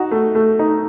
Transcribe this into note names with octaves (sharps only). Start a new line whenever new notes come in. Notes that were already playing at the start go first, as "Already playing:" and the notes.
Already playing: D#4 F#4
A3
A3
D#4